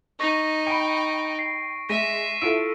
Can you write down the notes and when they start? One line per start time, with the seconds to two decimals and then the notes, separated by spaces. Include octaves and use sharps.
0.20 D#4 C#6 A#6 D#7
0.67 G5 B5 C#7 D7
1.39 C7
1.89 G#3 E5 A#6 B6 D#7
2.42 E4 F4 A4 E6 D7